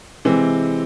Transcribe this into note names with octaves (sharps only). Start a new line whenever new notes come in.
C3 E3 G#3 C4